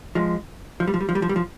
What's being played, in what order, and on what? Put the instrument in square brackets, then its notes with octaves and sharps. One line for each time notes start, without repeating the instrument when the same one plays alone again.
[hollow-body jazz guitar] F3 G#3
F3
G3
F3
G3
F3
G3
F3
G3
F3